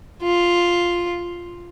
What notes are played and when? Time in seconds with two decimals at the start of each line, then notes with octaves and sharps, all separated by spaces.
0.22 F4